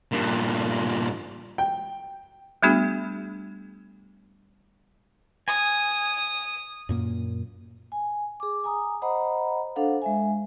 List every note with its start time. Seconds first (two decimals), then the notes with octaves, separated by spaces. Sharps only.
0.12 G2 A#2
1.58 G5
2.63 G3 A3 B3 D4 F#4 G#4
5.48 G#5 D#6
6.89 F#2 A#2 A#3
7.92 G#5
8.40 G#4 D6
8.64 G#5 A#5 D#6
9.02 C5 D#5 F#5 A#5 B5
9.76 D4 A4 C5 F5 F#5
10.02 G#3 E5 G#5